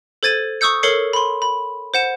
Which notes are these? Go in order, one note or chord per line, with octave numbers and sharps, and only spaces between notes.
A4 C5 G#6 A6 D#7
C#6 D#6 E6 G6 C#7
A4 A#4 C#5 C7 C#7
B5 C6
B5
C5 F#5 E7